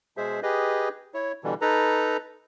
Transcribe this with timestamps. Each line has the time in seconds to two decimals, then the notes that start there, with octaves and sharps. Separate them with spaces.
0.17 B2 G#3 G#4 C5 E5
0.43 G4 G#4 B4 D#5
1.14 E4 C#5
1.44 B2 D3 E3 G3
1.61 D#4 A4 B4 A#5